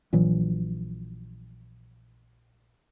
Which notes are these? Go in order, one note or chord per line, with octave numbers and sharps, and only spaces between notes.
A#1 A#2 E3 F#3